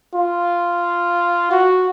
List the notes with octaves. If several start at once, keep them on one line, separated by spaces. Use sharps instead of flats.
F4
F#4